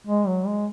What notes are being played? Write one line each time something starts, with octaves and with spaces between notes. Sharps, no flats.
G#3
F#3
G#3